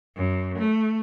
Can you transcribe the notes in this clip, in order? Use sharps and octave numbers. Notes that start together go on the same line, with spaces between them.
F#2
A3